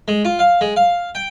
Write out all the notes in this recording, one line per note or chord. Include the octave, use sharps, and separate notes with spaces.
G#3
F4
F5
G#3
F5
G5